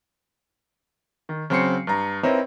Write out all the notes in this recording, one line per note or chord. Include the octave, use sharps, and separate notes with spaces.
D#3
C#3 F#3 C4 C6 C7 C#7
G2 A#5
C4 D#4 E4 A#4 B4 C#5